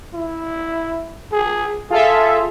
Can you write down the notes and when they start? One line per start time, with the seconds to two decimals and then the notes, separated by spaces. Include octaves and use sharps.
0.15 E4
1.32 G#4
1.90 F4 G#4 A4 E5